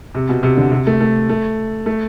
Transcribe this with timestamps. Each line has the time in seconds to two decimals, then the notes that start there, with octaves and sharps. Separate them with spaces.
0.15 C3
0.29 B2
0.43 C3
0.57 D3
0.71 C3
0.87 A3
1.00 A3
1.29 A3
1.86 A3